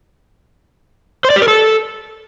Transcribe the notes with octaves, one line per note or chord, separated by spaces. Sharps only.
C5
D5
G4
A#4
A4